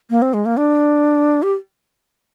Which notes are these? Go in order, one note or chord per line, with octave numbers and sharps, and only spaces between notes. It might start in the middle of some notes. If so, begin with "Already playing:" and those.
A#3
C4
G#3
A#3
D4
G4